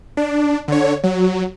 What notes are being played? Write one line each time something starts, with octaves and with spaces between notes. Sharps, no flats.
D4
D3 C#5
F#3